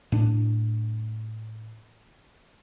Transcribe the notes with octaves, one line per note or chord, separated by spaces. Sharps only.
A2 D4